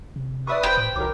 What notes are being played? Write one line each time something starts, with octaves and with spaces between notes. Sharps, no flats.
C3
B4 D5 E5 C#6 D#6
F1 C5 G5 B5 C6
A2
C2 D#3 F#3 A#4 D6